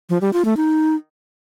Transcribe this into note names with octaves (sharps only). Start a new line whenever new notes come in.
F3
G3
F4
A3
D#4